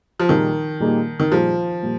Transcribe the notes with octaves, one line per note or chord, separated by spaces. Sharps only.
F3
A#2 D#3 G3 A#3 D#4 G#4
A#2 G3 A#3 D#4 G#4
D#3
A#2 F3 G3 A#3 D#4 G#4
A#2 G3 A#3